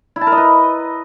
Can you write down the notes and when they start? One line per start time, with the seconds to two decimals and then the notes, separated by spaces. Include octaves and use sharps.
0.16 E4
0.21 A5
0.27 A#4
0.32 D#5
0.37 B4